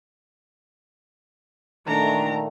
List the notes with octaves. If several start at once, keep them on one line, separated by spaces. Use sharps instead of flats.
A#2 D#3 A3 D4 A#5